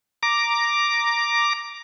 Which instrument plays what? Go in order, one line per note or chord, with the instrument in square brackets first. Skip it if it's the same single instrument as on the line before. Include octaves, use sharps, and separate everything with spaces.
[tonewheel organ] A#5 D6